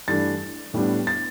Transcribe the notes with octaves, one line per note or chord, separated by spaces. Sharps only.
G2 E3 A3 D4 A6
A2 G3 B3 D4
A6